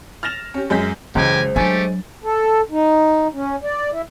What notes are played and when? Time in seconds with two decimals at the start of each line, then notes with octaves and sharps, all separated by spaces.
0.23 F6 A6 A#6 E7 F7
0.54 C#4 G4
0.70 F#2 G#3 G#4 G6 A#6 B6
1.15 C#2 F#2 E3 G#3 G4 A#4 C5 G#5
1.56 F#3 A3 D4 G4 G#5 A6
2.24 A4
2.71 D#4
3.34 C#4
3.63 D5
3.92 E4